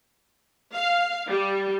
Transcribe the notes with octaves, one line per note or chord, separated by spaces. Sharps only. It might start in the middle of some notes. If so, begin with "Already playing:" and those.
F5
G3